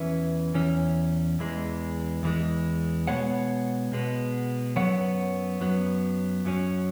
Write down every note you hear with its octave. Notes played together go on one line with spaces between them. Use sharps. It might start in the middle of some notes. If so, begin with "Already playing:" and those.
Already playing: E2 E3 C#4 B4 E5
E2 E3 C#4
E2 E3 G#3
E2 E3 G#3
B2 G#3 B3 C#5 F#5
B2 G#3 B3
F#2 F#3 B3 C#5 F#5
F#2 F#3 B3
F#2 F#3 C#4